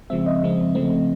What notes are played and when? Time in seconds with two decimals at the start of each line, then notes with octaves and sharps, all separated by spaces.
0.10 C#3 F3 G#3 C4 E5
0.26 D#5
0.42 C#3 F3 G#3 C4
0.75 C#3 F3 A3 C4